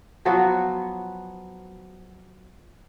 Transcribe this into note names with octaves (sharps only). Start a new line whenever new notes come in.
F3 F#3 B3 F#4